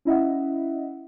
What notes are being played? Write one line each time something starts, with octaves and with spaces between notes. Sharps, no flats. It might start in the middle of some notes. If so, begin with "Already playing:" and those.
C#4 E4 D#5 E5 F#5